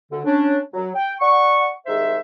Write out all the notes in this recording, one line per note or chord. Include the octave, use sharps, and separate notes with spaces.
D2 D3
C#4 D4
F#3
G5
D5 F#5 C#6
C2 G#2 D#3 G#3 C5 E5